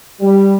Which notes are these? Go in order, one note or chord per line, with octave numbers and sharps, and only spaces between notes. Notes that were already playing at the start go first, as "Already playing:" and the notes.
G3